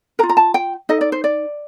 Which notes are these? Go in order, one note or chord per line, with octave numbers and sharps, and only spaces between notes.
A#4 A#5
F4
A#5
A5
G5
D#4 A4 D#5
D5
C5
D5